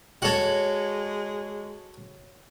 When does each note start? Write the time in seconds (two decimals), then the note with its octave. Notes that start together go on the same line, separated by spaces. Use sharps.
0.22 G#3 F#4 A4 C#5 F#5